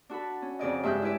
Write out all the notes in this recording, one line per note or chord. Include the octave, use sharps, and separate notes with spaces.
D4 F#4 A4 B5
C#4
F2 C#3 D5 D#5
G2 G#3 E5 E6 F#6 G6
E4 G#4 B4 D5 E5